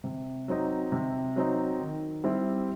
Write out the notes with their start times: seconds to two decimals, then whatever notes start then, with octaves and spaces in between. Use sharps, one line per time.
0.04 C3
0.48 F#3 C4 D#4
0.92 C3
1.36 F#3 C4 D#4
1.80 D#3
2.24 G3 C4 E4 G4